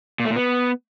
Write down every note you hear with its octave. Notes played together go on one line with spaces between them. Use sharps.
A#2
A3
A#2
B3